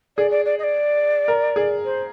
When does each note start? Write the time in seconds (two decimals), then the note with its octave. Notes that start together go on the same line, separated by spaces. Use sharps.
0.17 G#4 D5
0.31 D5
0.45 D5
0.59 D#5
0.63 D5
1.28 A#4
1.56 G#4
1.85 C5